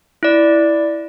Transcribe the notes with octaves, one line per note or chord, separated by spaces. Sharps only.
E4 D5